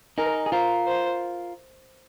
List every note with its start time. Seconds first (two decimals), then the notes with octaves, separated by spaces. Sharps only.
0.18 D#4 G#4 A#4
0.46 G#4
0.52 F4 A#4 C5
0.87 C5